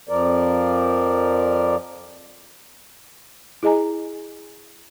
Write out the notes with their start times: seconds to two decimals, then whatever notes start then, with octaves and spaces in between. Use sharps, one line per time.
0.09 F2 F3 A#4 D5
3.63 E4 G#4 D#5 G#5 A#5